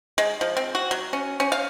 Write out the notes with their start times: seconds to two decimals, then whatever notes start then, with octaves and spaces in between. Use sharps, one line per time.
0.18 G#3
0.41 F3
0.57 C4
0.75 F#4
0.91 F#3
1.13 C#4
1.40 C#4
1.52 F5